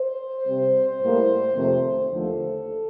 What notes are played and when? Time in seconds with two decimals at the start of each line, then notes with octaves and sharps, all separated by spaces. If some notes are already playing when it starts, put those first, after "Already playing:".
Already playing: C5
0.47 C3 G3 C4
1.01 A2 G3 A#3
1.55 F2 C3 D#3 A3
2.09 D#2 D3 F3 A3 A4